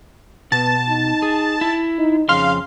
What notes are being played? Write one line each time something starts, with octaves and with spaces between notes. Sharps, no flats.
B2 B3 A5
D#4
G#4
E4
D#4
F2 C#3 F5 C6